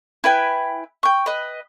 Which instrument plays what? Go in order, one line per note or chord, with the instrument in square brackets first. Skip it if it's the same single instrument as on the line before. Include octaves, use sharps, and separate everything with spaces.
[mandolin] E4 B4 G5 G#5
G5 C#6
B4 D#5